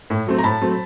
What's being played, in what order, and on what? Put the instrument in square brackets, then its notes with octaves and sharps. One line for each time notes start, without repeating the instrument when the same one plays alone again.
[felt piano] A2
F#3 A3 C4
A#5
A2 A5 B5
F#3 A3 C4